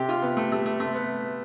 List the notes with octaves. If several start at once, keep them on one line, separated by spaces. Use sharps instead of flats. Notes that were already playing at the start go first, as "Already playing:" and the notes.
Already playing: C3 G4
F4
C3 B3
A3
G3 A3
A3
C3 A3
B3